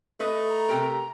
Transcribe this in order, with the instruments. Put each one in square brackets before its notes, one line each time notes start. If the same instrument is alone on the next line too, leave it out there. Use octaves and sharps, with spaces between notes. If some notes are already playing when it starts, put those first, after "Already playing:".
[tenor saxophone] A3 [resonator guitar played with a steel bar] B4 D#5
[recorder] A#5
[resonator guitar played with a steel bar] C3 G4 A#4